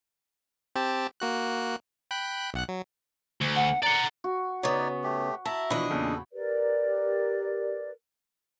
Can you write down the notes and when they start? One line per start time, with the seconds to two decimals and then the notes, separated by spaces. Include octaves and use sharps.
0.75 C4 G4 A5
1.20 A#3 F#4 F#6
2.11 G5 B5 F#6
2.54 B1 F#5 F#6
2.68 F#3
3.41 D2
3.56 F#5
3.83 D5 F#5 A#5
4.24 F#4
4.63 C#3 B3 D#4 C#5 D5
5.04 A3 G4
5.45 E4 E5 A5 A#5
5.70 B2 E3 F3 D4 D#5 B5
5.90 E2 A#2 C#3 A4
6.33 G4 A#4 B4 D5